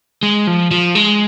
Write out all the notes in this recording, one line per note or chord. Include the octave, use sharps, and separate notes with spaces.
G#3
F3
F3
G#3